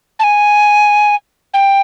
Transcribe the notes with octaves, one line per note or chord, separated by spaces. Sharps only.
A5
G#5
G5